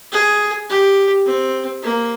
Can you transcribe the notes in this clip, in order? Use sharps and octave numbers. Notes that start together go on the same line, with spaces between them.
G#4
G4
C4
A#3